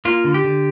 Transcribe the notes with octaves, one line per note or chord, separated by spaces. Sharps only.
A#3 F4
D3
G4
D3